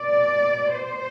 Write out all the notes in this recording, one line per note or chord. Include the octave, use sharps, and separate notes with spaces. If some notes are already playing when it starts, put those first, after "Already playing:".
Already playing: B2 D5
C5